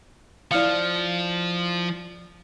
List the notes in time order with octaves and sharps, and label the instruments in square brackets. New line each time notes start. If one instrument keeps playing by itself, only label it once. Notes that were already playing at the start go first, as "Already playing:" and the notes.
[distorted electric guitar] F3 [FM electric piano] E4 F5 [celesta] D5 F6 C#7